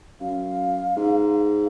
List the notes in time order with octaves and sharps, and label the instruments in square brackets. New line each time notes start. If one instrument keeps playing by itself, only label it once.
[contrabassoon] F#2 [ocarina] F5
[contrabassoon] G#2
[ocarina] F5